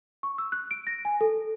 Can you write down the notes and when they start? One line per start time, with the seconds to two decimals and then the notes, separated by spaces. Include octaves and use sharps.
0.23 C#6
0.38 E6
0.52 F#6
0.71 D7
0.87 A#6
1.05 G#5
1.21 A4